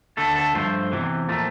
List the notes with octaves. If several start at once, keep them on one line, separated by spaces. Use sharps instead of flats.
D2 D3 A3 A4
A4
G2 F3 A3 C5
E2 C3 E3
A#2 F3 A3